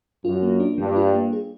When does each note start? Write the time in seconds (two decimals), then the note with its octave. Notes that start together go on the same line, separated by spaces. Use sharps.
0.25 F#2 F4
0.42 A#3
0.60 D4
0.78 G2 G3
0.96 F4
1.15 A#3
1.33 G#4